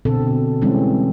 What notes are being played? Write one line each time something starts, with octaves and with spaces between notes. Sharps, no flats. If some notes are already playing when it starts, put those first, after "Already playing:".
B2 D3 C4 A4
E3 G3 G#3 C4 C#4